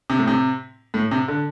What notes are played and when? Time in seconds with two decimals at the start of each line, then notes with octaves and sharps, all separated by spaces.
0.10 C3
0.19 A2
0.28 C3
0.94 A2
1.11 C3
1.28 D3